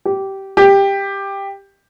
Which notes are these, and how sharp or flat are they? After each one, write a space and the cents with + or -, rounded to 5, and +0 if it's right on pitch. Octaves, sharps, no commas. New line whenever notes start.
G4 -15
G4 +10